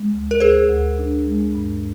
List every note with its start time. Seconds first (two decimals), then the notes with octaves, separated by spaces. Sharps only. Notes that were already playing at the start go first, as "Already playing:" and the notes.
Already playing: G#3
0.12 D2
0.31 A#4
0.40 D2 G#4 C5
0.69 D2
0.98 D4
1.26 G#3
1.55 G2